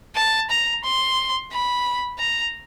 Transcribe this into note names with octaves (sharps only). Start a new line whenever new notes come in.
A5
A#5
C6
B5
A#5